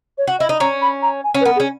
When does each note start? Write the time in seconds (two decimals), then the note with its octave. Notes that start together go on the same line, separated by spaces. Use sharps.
0.18 C#5
0.27 F#4
0.39 E4 D#5
0.49 D#4
0.60 C#4 A#5
0.82 B5
1.02 A#5
1.24 G#5
1.34 C#4
1.41 B4
1.45 B3 A#4
1.56 G#4
1.60 C#4